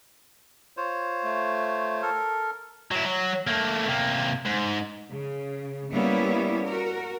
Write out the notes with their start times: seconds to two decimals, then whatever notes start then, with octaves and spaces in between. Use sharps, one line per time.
0.77 F4 C5 C#5
1.23 A3
2.02 A4 A#4
2.91 F#3 E4
3.06 F#3
3.47 A3 A#3
3.89 C3 A#3
4.46 G#2
5.11 C#3
5.92 G3 A#3 B3 C#4 E4
6.65 F#4 A#4